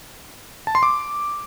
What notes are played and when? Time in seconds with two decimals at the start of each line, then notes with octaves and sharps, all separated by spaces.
0.67 A5
0.75 C6
0.83 D6